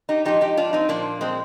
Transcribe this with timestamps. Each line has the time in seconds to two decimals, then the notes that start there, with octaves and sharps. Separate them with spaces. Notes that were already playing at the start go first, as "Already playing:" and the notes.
0.09 D#4 G4
0.25 G#2 F3 D#4 G4
0.41 D#4 G4
0.57 D4 F4
0.73 C4 D#4
0.89 A#2 F3 A#3 D4
1.21 G#3 C4